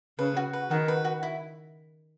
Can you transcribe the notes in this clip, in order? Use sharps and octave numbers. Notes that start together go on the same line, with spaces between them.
C#3 B4
F#4
B4
D#3 F#4
B4
F#4
E4